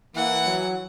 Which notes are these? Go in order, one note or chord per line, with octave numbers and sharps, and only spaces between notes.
E3 A#3 F#5
F#3